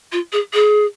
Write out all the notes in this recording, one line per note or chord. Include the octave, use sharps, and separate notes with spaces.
F4
G#4
G#4